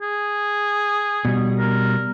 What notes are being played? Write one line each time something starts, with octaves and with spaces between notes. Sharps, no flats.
G#4
B2 G3
A#4